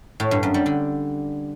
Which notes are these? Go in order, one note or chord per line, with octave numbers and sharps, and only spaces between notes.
A2
G2
F#2
G3
D3